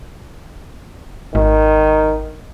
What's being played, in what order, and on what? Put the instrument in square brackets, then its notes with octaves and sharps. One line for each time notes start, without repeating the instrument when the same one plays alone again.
[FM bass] G#1 [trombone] D#3